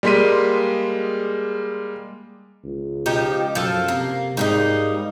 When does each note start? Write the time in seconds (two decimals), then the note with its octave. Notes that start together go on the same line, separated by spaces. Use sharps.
0.03 G3 G#3 A#3 C6 B6 D#7
2.64 C#2
3.06 F3 D#4 G4
3.55 F#2 F3 A4
3.88 C3 A#3
4.37 G#2 G3 A#3 D#4